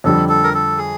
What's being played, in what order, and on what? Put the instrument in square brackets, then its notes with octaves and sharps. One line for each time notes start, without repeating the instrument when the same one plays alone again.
[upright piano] F2 D3 G3 [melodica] A4
[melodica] A4
A#4
A4
G#4